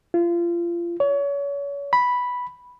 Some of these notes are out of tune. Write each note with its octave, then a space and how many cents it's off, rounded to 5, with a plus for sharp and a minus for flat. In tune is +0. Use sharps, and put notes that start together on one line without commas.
F4 -30
C#5 +30
B5 -5